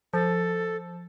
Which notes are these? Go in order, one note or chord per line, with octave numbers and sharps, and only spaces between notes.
F3 A4